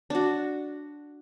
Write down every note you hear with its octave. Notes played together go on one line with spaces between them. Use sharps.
D4 F#4